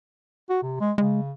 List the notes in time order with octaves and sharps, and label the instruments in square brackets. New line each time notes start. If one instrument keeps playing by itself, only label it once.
[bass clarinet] F#4
C3
G#3
[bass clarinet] C#3 [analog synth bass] G#3